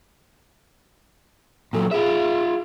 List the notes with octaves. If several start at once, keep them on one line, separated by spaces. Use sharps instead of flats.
A#2 F#3 A4
F4 G#4 E5